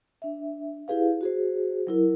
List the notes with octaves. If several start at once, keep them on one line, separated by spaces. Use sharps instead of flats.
D4 E5
E4 G4 G#4 B4 F5
F#4 G#4 C5
F#3 E4 A#4